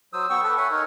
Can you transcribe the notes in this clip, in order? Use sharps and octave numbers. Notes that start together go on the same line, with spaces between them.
F#3 C5 D#6 E6
B3 G5 C#6 E6
A4 B4
C#5 E5 F#5 G#5
D#4 A#4 C#5